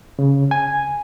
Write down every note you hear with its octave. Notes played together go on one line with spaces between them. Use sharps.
C#3
G#5